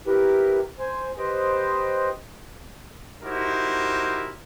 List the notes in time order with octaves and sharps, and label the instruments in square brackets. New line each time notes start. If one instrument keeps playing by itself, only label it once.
[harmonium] E4 G4 A#4 B4
C5 G#5
G4 B4 C5 D#5 G5
[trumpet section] D#4 E4 F#4 G4 A#4 C5